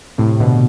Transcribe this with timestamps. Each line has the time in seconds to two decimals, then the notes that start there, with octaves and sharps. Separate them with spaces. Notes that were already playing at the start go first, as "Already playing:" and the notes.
0.18 A2 C3
0.40 B2 D3